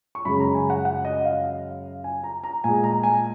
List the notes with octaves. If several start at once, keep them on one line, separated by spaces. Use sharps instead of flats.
C#6
F#2 C#3 G#3 B5
A#5
G#5
F#5
F#5
D#5
F5
G#5
A#5
A#5
A#2 G#3 G#5
A#5
G#5